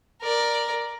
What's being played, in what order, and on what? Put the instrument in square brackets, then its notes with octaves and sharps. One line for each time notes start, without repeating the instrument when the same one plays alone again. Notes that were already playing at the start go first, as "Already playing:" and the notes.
[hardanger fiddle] A#4 D5